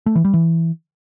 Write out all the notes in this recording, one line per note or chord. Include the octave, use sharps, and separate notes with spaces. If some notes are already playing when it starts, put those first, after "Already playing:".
A3
E3
G3
E3